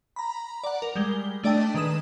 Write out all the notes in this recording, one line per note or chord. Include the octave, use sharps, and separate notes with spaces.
A#5 B5
D5 F#5
A#4
G3 G#3 G7
A3 D4 D5 D#5 G5 A5
D#3 G#3 B4 D#6 E7